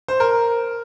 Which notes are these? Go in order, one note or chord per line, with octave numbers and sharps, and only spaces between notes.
C5
A#4